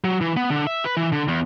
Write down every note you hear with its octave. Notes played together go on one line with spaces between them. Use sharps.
F#3
E3
B3
D3
E5
B4
E3
D3
E2